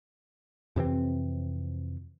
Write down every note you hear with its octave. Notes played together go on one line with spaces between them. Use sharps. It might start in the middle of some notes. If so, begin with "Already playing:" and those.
F2 C3 E3 C4